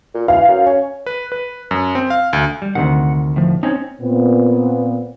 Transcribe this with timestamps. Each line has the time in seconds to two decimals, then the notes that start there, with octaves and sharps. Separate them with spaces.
0.15 A#2
0.28 E3 F5
0.48 F#2
0.66 C#4
1.06 B4
1.32 B4
1.71 F#2
1.95 C4
2.10 F5
2.33 D2
2.62 G3
2.75 D2 C3 D#3 F#5
3.36 A2 F3
3.63 C4 C#4 D#4 C#5
4.02 A#2 B3 C4